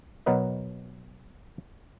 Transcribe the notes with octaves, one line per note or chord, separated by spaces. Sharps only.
B2 F#3 A#4 B4 D#5